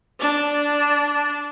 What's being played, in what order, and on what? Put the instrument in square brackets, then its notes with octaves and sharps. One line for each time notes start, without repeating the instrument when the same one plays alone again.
[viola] D4